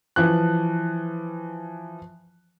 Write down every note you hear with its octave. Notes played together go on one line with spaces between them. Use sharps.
E3 F3 F#6